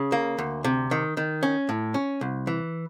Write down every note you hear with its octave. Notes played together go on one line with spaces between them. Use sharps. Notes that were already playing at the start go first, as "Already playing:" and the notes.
Already playing: C#3
A#3
D2
C3
D#3
D#3
C#4
A2
C#4
C2
E3